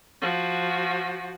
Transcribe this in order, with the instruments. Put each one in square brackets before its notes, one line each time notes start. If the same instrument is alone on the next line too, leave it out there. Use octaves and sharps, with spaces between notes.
[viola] F3 F#4